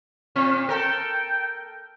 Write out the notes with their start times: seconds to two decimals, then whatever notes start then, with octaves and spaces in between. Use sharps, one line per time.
0.36 A#2 C4
0.69 A4 A#4 G5